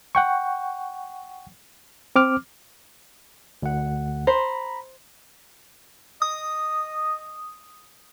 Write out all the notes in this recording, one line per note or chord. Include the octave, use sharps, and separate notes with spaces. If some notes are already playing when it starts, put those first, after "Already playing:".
F#5 G5 C#6
C4 D6 F6
D2 F#5
C5 A#5 B5
D#5 D#6